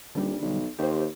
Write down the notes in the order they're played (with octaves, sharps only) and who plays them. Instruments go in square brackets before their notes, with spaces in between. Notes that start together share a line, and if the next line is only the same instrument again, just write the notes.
[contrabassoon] D#1 [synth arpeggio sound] D3 G3
[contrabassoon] B1
[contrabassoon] D#2 [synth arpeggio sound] G4 C5